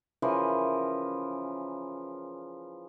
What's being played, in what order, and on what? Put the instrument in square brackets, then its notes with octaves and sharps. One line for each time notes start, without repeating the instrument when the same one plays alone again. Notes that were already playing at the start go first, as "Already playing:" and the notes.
[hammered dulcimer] C#3 E3 F3 A#4